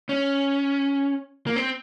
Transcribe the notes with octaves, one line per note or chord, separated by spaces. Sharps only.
C#4
A#3
C4